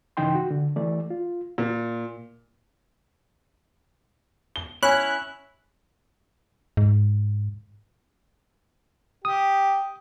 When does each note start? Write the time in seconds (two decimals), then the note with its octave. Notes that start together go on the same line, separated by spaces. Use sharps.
0.17 G2 C#3 E3 D#4 G5 C6
0.35 F#4
0.51 D3
0.76 E3 A3 D5
1.10 F4
1.58 A#2
4.56 G7
4.83 C#4 E4 C#5 G#5 B5 F#6
6.77 G#2
9.25 G4 D#6